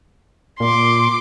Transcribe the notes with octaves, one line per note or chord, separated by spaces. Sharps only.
A#2 C6 D6